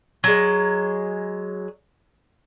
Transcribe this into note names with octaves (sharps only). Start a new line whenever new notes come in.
F#3 G#3